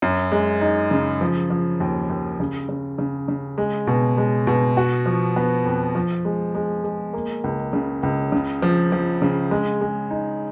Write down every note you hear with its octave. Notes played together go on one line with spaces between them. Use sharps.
F#2
G#3
D#4
C#3
F3
F3
D#2
D#2
C#3
C#3
C#3
C#3
G#3
B2
G#3
B2
F#4
F3
B3
F2
F3
G#3
G#3
G#3
A#3
C#2
C#3
C#2
C#3
F3
F3
C#3
G#3
G#3
D#4